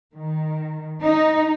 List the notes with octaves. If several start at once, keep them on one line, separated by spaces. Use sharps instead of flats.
D#3
D#4